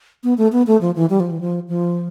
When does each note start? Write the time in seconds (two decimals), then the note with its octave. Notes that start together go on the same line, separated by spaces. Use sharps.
0.24 B3
0.38 A3
0.52 B3
0.67 A3
0.81 F3
0.96 E3
1.10 G3
1.20 F3
1.31 E3
1.41 F3
1.68 F3